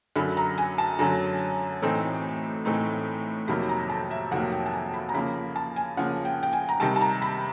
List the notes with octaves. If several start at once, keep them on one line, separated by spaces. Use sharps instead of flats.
F#2 D3 F#3 B5
A#5
G#5
A5
F#2 D3 F#3 A#5
A2 E3 A3 C4 D#4
A2 E3 A3 C4 D#4
F2 C3 D#3 F#3 A#3 B5
A#5
A5
E5
F2 C3 D#3 F#3 A#3 F#5
G5
A5
G#5
B5
A#5
C#3 F3 A#3 B5
A5
G#5
C#3 F3 A#3 F#5
G5
G5
G#5
A#5
C3 D#3 G3 A5
A5
A#5
B5